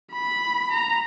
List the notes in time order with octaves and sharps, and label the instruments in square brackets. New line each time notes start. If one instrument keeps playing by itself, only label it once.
[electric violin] B5
A#5